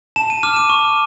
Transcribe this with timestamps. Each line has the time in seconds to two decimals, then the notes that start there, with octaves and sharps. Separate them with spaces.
0.16 A5 E7
0.30 D#7
0.43 D6 F6 E7
0.56 D#7
0.70 C#6